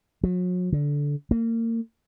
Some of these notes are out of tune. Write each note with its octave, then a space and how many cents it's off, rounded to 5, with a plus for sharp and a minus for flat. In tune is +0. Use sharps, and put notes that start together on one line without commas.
F#3 -40
D3 -15
A#3 -30